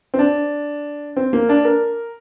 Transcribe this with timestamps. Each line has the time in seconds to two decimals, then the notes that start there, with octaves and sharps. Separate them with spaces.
0.14 C4
0.19 D4
1.16 C4
1.33 A#3
1.49 D4
1.65 A#4